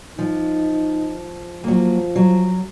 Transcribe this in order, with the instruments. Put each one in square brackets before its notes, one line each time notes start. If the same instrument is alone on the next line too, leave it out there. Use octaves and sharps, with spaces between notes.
[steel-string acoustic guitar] F3 [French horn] D#4
[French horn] F3 [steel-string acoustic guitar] F#3 A#3
[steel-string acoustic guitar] F#3